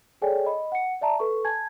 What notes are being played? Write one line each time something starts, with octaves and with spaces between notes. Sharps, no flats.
G#4 A4 C#5 D5 G5 G#5
D#5 B5
F#5 C#7
D5 E5 A5 A#5
A4 B4 C#6
G#5 A5 G#6